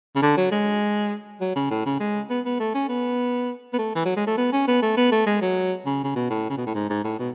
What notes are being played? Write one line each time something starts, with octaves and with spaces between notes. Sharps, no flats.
C#3
D3
F#3
G#3
F#3
C#3
A2
C#3
G#3
B3
B3
A3
C#4
B3
B3
A3
E3
F#3
G#3
A3
B3
C#4
B3
A3
B3
A3
G#3
F#3
C#3
C#3
B2
A2
C#3
B2
A2
G#2
G#2
A2
B2